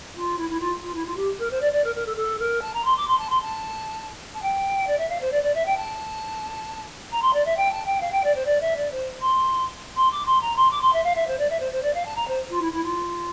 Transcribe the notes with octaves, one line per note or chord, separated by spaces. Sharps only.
F4
E4
E4
F4
F4
E4
F4
G4
A#4
C5
D5
D5
A#4
A#4
A4
A4
A#4
A5
A#5
C6
D6
C6
A5
C6
A5
A5
G5
D5
E5
F5
C5
D5
D5
E5
G5
A5
A#5
C6
D5
E5
G5
A5
G5
F5
G5
D5
C5
D5
E5
D5
C5
C6
C6
D6
C6
A#5
C6
D6
C6
E5
F5
E5
C5
D5
E5
C5
C5
D5
F5
A5
A#5
C5
F4
E4
E4
F4